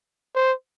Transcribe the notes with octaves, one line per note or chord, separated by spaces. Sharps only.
C5